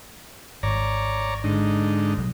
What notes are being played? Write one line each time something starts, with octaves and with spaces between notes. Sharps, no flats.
G#1 C#5 D5 A#5
G#2 D3 D#4
B2 F#3 G3